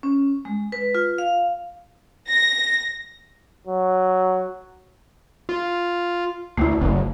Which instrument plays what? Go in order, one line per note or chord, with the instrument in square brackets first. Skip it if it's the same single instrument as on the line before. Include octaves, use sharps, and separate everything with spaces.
[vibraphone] C#4
G#3
B4
F4
F5
[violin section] A#6
[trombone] F#3
[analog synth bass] F4
[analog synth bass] D2 [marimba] A3 E4
[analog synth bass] F#1